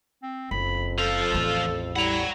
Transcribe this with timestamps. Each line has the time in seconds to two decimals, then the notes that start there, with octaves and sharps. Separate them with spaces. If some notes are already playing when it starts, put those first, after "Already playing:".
0.23 C4
0.51 F#1 F2 B5
0.98 F3 A4 F5
1.32 A1 E2
1.96 G3 E4 F#5 A#5